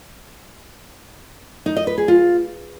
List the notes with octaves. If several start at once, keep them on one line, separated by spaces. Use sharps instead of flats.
D#4
D#5
B4
G#4
F4